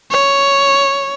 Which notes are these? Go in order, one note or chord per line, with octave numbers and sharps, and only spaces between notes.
C#5